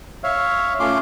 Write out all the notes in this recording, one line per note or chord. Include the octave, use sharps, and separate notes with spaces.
C#5 E5 F5
A3 C#4 F4 C6 D6